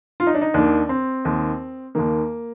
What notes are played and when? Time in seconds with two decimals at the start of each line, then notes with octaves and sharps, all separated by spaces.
0.20 F4
0.27 D#4
0.34 D4
0.41 D#4
0.54 D#2 D#3 D4
0.89 C4
1.25 D#2 D#3
1.95 D#2 D#3 A#3